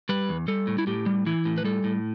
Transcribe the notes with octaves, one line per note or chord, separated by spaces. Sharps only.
G3 B4
E2
G3 A4
A2
E4
A2 G4
G3
E3 E4
A2
B4
G3 A4
A2